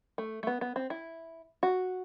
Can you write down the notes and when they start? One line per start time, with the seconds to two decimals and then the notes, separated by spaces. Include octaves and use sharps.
0.18 A3
0.43 A3
0.47 B3
0.61 B3
0.76 C4
0.90 E4
1.63 F#4